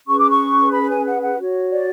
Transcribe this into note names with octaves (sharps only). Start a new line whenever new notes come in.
C#4 G#4 B4 C#6
D6
C#6
B5
G#5
F#5
F#5
F#4 C#5
D5